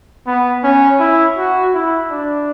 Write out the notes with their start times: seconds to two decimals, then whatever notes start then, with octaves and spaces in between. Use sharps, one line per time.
0.27 B3
0.64 C#4
1.00 E4
1.38 F#4
1.74 E4
2.11 D4